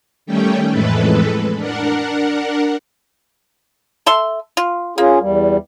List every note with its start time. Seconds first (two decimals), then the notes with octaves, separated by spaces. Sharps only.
0.26 D#3 G3 A3 C#4 G5
0.70 F2 A2 E3 G#3 A4 B4
1.56 D4 A#4 F#5
4.06 A4 E5 C6
4.57 F4
4.98 A#3 C#4 F4 G#4
5.21 E2 G3